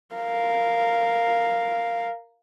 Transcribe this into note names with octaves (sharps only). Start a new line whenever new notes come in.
A#4 F5